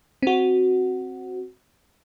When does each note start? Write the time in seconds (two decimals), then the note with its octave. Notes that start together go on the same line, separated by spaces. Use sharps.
0.22 C4 F#4